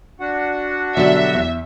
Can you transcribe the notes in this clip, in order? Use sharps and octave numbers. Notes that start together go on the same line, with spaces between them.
D4 F#4 F#5
B2 D3 F#3 G3 E5
E2